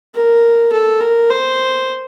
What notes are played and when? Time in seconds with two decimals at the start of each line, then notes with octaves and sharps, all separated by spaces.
0.15 A#4
0.72 A4
1.01 A#4
1.30 C5